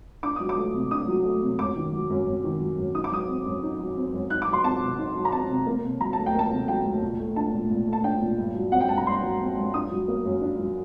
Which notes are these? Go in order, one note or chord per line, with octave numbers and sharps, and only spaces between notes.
D4 D6
F#3 D#6
D6
A3
C3
D4 D#6
F#3
A3
C3
F#2 D6
D#3
F#3
F#2
F#2
D#3
F#3
F#2
D#4 D#6
D6
F#3 D#6
C4
F#2
D#4
F#3
C4
F#2
D#4 F#6
D6
F#3
C6
C4 A5
C3
D#4
F#3
A#5
C4 A5
C3
A#3
C3
F#3 A#5
D2 A5
G5
A#3 A5
C3
F#3 G5
D2
A#2
A3
D4 A5
A#2
A#2
A3
A5
D4 G5
A#2
G2
F#3
C4 F#5
G5
G2 A5
A#5
G2 C6
F#3
C4
G2
D4 D#6
F#3
A#3
F#2
D4
F#3